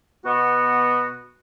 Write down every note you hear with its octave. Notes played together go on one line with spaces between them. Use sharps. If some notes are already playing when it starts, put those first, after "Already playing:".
B2 B3 F#4